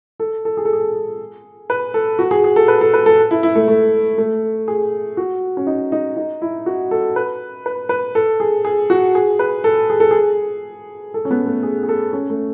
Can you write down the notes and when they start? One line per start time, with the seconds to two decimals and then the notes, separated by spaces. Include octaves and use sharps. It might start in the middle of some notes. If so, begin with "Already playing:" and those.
0.20 A4
0.45 A4
0.57 G#4
0.65 A4
0.73 G#4
1.70 B4
1.94 A4
2.19 F#4
2.31 G#4
2.44 G#4
2.56 A4
2.68 B4
2.81 A4
2.93 B4
3.06 A4
3.31 E4
3.43 E4
3.55 A3
3.68 A3
4.18 A3
4.68 G#4
5.17 F#4
5.57 C#4
5.67 D#4
5.92 D#4
6.17 D#4
6.42 E4
6.66 F#4
6.91 A4
7.16 B4
7.66 B4
7.89 B4
8.15 A4
8.40 G#4
8.65 G#4
8.90 F#4
9.15 G#4
9.39 B4
9.64 A4
9.90 G#4
10.00 A4
10.11 G#4
11.14 A4
11.25 C#4
11.31 B3
11.46 A3
11.63 G#4
11.83 G#4
11.89 A4
12.13 C#4
12.30 A3